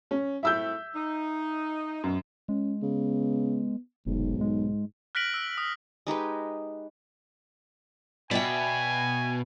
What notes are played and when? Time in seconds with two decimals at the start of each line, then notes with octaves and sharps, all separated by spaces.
0.11 C#4
0.43 A3 C4 E4 E5 E6 G6
0.95 D#4
2.03 F#2 B2
2.49 G#3 C#4
2.82 C#3 B3
4.06 F1 B1 G#2
4.41 G#3
5.15 F6 F#6 A#6 B6 D7 F#7
5.34 E6
5.58 D#6
6.07 G#3 D#4 G4 B4
8.31 B2 D5 E5 G5 G#5